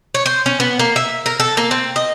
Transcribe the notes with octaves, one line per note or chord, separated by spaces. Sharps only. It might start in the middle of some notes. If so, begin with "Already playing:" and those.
C#5
C5
C#4
B3
A#3
E5
A#4
A4
A#3
C4
D#5